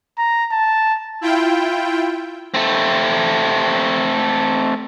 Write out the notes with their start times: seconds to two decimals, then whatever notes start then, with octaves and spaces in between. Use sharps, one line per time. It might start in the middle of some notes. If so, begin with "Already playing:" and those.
0.18 A#5
0.52 A5
1.21 E4 F4 G5
2.54 A3 C4